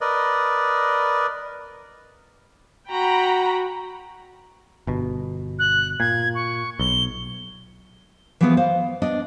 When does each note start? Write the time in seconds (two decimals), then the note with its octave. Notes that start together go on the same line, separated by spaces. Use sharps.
0.01 A#4 B4 D5 D#5
2.90 F#4 G5 A#5 B5
4.87 G1 B2
5.59 F#6
6.00 A#2 G#6
6.35 C#6
6.79 B1 G7
8.41 E3 F3 A3 B3 G#4 B4
8.57 C5 F5
9.02 B3 D4 D#5